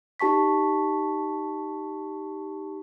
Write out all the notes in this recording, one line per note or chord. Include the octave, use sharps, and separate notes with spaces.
D#4 G4 A5 C#6 B6